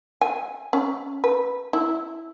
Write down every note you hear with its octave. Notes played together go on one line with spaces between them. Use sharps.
G#5
C#4
B4
E4